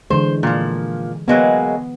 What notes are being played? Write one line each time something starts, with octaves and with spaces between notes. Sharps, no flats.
D3 E3 G#3 C5
A#2 F3
F#3 G#3 A#3 B3